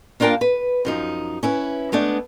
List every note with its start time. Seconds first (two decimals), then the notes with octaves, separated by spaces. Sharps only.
0.20 A#3 D4 F4 A#4 G5 A5
0.41 B4
0.85 F#2 F3 D#4
1.43 C#4 E4 B4
1.92 G#3 A3 B3 D4